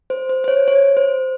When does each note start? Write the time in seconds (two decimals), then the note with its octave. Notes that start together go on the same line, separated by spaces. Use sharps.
0.10 C5
0.29 C5
0.44 C5
0.48 C#5
0.68 C#5
0.97 C5